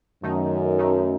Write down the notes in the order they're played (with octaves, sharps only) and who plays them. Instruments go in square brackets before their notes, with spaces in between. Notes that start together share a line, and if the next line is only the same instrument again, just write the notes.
[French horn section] F#2 [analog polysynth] D#3 A3 D#4
[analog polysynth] D#3 A3 D#4